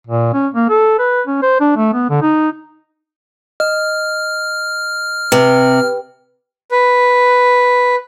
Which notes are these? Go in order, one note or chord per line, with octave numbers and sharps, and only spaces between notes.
A#2
C#4
A#3
A4
B4
C#4
C5
D4
A3
B3
D3
D#4
D#5 F6
C3 B4
B4